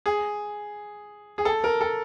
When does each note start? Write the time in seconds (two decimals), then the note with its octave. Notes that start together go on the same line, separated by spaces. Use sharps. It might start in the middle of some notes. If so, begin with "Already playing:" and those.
0.06 G#4
1.38 G#4
1.45 A4
1.64 A#4
1.81 A4